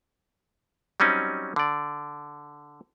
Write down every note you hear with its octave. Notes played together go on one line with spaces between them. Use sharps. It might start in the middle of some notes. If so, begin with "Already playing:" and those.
F#3 G3 C4 C#4 D#4
D3 D5